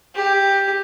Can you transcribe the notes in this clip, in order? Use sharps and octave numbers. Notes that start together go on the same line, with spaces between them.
G4